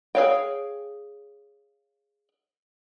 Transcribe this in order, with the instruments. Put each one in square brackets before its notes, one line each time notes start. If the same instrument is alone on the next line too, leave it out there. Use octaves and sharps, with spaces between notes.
[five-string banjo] G#4 A4 C#5 F5 G5